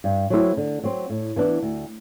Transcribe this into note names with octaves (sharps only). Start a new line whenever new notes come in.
G2
F#3 A3 C4 E4
D3
F#3 C4
A2
E3 B3 D4
D2